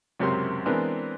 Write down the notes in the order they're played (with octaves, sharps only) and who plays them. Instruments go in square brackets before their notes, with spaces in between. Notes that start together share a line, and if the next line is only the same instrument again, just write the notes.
[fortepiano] C#2 F#2 C3 G4 A#4 C6
E3 G#3 B3 C4 D4 A#4